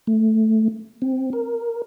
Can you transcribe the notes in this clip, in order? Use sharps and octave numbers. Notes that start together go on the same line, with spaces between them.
A3
C4
A#4